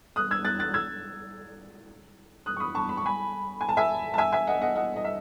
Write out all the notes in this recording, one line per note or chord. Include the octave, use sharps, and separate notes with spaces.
D#6 F#6
E6 G#6
F#6 A6
F#6 A6
E6 G#6
D#6 F#6
C#6
B5 D#6
A5 C#6
B5
C#6
G#5 B5
G#5
A5
E5 G#5
A5
E5 G#5
E5 G#5
D#5 F#5
D#5 F#5
D#5 F#5
D#5
E5